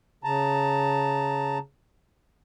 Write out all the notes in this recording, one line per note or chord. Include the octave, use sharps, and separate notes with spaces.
C#3 A5 A#5